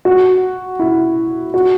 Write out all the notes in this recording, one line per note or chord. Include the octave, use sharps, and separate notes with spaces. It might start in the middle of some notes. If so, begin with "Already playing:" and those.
F#4
E4
F#4